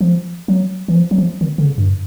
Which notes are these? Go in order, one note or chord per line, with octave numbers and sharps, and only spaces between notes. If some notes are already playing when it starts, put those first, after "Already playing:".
F3
F#3
E3
F3
F#3
F3
D#3
D3
C#3
G2